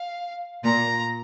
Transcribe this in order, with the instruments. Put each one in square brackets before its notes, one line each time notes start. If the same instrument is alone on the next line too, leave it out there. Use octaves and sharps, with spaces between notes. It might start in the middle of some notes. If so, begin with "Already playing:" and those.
Already playing: [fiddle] F5
[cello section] A#2 [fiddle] A#5